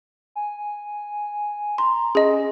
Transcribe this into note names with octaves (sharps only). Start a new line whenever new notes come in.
G#5
A#5 C6
C#4 G#4 D#5